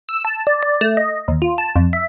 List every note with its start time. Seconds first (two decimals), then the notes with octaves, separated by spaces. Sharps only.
0.09 E6
0.25 A5
0.47 D5
0.63 D5
0.81 A3
0.97 D#5
1.28 D#2
1.42 F4
1.58 A5
1.76 F2
1.93 E5